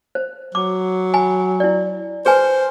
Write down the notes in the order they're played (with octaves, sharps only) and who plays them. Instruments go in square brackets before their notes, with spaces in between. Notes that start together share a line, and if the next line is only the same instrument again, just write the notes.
[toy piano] C5
[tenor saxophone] F#3 [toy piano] D6
[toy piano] G#5 B5
E4 D5
[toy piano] G#4 B4 G#5 [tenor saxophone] C5